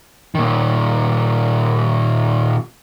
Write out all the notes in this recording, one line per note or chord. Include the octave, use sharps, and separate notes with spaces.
A#2 D#3